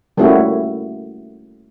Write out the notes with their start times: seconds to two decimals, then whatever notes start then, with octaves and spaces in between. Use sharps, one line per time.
0.17 G3 A3 A#3 C#4 E4 F#4